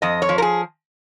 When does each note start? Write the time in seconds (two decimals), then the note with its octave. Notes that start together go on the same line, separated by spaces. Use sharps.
0.02 F2 D#5
0.22 C#5
0.29 F3
0.38 A#4
0.42 G#4